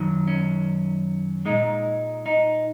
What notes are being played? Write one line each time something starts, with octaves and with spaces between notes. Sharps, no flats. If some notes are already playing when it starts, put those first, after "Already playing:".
Already playing: F#2 D#3 F#3
C#4
A#2 G#3 D#4
D#4